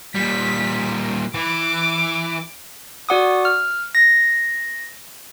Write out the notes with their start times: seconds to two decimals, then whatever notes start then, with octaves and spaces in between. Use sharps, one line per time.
0.15 A#2 G3 B6
1.34 E3 D6
3.09 F#4 D5 F#5 D6 D#6
3.45 F6
3.95 A#6